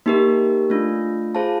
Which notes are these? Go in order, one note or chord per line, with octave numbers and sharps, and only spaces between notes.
A#3 D#4 G4 A#4
A3 D4 F4
F4 G#4 C5 F5 A5